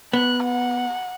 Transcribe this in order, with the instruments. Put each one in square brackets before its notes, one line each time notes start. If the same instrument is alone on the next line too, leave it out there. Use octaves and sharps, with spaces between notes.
[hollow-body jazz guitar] B3 [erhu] F#6
[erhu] F#5